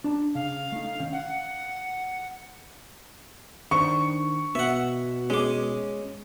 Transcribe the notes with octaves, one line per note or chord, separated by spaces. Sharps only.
D4 A5 A#5
C#3 F5
A3 D#4
D#3 C#4 G5
F5 F#5
D#3 D4 C5 C#6
B2 B3 E5 F#5
G#3 C#4 G#4 D6